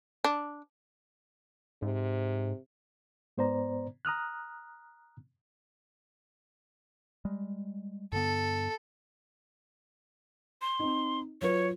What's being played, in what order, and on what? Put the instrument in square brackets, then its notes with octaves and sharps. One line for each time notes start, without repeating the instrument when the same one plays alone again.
[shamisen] D4
[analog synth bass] G#2 [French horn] C3
[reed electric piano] G#2 B3 C5 D5 A#5
A#5 D#6 F6 F#6
[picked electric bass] G3 G#3
[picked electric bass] G2 D3 B3 [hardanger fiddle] A4
[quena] C6
[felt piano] C4 D#4
[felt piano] F#3 F4 B4 [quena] C#5